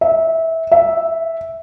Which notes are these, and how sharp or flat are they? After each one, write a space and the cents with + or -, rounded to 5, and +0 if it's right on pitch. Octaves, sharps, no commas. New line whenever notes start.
E5 -20
E5 -5